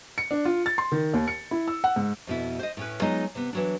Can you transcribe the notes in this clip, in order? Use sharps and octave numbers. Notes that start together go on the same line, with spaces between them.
C#7
D4
F4
A6
C6
D#3
D#2
C#7
E4
E6
F#5
G#2
F2 B2 E4
C5 D#5
A2 C#4 B4
F#3 G#3 B3 D#4 F4 D#5
C3 B3
E3 F#3 D4